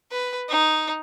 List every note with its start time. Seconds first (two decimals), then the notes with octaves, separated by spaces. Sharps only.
0.12 B4
0.49 D#4